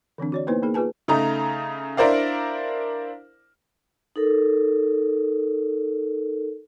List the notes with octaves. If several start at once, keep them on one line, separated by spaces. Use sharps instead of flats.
D3 E3 C4 D4
F#4 C#5 D5
A#3 B3 D#4 E4 B4 C5
A#3 D#4 G#4 A#4
F4 G#4 B4 G#5 A5
C#3 A3 D#4 A#5
D4 E4 A#4 C5 D5 F5
D#4 A4 A#4